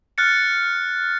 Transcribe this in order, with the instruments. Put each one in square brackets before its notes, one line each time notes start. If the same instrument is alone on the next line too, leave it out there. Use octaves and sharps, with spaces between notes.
[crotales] F6 F#6 A6 C#7